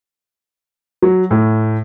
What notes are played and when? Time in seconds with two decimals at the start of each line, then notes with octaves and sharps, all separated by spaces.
1.02 F#3
1.31 A2